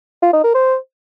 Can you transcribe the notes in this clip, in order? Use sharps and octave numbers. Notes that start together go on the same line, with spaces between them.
F4
D#4
A#4
C5